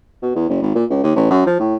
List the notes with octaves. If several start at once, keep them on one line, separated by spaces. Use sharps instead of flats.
B2
E2
F#1
G#1
A#2
C#2
D#2
A1
F#2
F3
A2